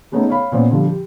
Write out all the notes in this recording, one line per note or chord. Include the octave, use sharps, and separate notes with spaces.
G#3 A3 B3 C#4 D#4
C#5 F5 B5
A#2 B3 C#4 C5 D5
D3 F3 G3
G4